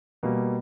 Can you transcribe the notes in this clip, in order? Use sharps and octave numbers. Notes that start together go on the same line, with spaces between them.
B2 G3 A#3